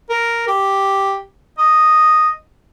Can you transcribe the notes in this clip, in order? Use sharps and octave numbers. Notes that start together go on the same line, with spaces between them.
A#4
G4
D#5